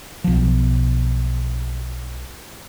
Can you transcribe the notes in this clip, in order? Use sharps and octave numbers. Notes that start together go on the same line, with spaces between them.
B1 F3